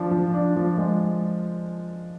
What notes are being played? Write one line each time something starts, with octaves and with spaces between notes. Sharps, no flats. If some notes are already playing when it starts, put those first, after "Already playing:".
Already playing: F3 D4
F3
D4
F3
G#3